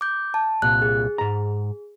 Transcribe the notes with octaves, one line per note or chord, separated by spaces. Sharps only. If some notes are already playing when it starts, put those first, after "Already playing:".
D6 G6
A5
C2 A#2 F#6
G#4
G#2 A#5